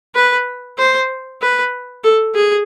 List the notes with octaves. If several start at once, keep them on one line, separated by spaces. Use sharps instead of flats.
B4
C5
B4
A4
G#4